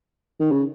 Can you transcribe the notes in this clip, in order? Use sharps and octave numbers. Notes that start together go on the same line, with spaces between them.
D#3
C#3